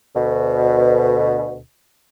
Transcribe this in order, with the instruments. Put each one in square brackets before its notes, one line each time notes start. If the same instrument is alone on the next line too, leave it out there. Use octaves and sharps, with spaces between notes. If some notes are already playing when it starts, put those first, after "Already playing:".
[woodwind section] D2 B2